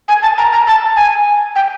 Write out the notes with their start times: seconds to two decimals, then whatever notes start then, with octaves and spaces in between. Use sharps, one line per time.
0.08 G#5
0.22 A5
0.38 A#5
0.52 A#5
0.67 A5
0.96 G#5
1.56 G5